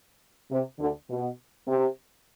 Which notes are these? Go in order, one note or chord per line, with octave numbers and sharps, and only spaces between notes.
C3
D2 D3
B2
C3